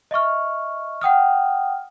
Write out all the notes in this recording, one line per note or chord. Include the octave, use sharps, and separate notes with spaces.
D#5 E5 C#6 F6
F#5 G5 D#6 F6